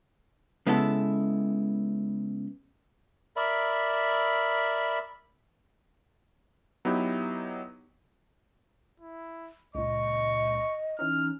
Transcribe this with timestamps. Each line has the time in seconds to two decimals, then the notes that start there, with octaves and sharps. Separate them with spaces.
0.67 C#3 G#3 B3 E4 A4
3.36 A#4 D5 E5 B5
6.85 F#3 B3 D#4 E4 G4
9.00 E4
9.75 C#2 A#2 D#5 C#6
10.99 E3 C#4 D#4 F6